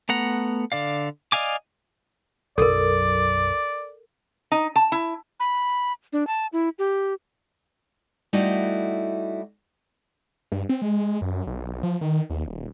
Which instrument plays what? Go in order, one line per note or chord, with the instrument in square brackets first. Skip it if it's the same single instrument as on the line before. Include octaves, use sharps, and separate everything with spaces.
[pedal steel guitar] A3 B3 F#5 A#5
D3 D5 F5
D5 D#5 F5 G#5 D6
[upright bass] B1 F#2 [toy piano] A4 A#4 [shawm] D5
[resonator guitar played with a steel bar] D#4
A5
E4
[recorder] B5
D4
A5
E4
G4
[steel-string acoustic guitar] G3 A3 D#4 E4 F#4
[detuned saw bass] G2
C4
G#3
F#2
B1
F3
D#3
D#2
D#1